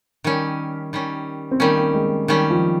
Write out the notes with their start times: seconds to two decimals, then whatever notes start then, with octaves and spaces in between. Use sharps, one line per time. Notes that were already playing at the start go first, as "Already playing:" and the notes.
0.24 D#3 G3 C#4
0.93 D#3 G3 C#4
1.51 C4
1.60 D#3 G3 A#3 C#4
1.78 A#3
1.94 G#3
2.28 D#3 G3 C#4
2.50 F3